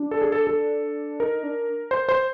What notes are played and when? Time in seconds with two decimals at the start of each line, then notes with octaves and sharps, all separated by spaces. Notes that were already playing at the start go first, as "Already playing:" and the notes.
Already playing: D4
0.11 A4
0.22 G#4
0.32 A4
0.47 A4
1.20 D#4 A#4
1.43 D4
1.91 C5
2.09 C5